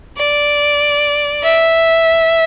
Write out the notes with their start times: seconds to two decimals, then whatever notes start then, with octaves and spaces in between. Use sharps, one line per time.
0.17 D5
1.43 E5